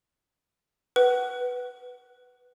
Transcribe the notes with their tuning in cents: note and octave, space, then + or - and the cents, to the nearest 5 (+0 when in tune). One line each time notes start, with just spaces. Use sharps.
B4 +0 F#5 +25